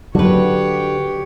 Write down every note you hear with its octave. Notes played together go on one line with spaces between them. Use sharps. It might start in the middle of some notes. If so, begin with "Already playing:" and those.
D3 F#3 F#4 G4 B4 C#5